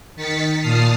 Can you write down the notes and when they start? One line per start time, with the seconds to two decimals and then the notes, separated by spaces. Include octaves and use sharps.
0.16 D#3 A6 B6 C#7
0.60 A#2 A5 D#6 F6 C7